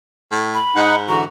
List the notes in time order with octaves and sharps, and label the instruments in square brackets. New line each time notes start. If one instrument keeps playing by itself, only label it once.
[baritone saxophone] A2
[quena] B5
[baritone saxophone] G#2 [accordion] D#4 F#5
[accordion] D3 E3 F#4 [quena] A#5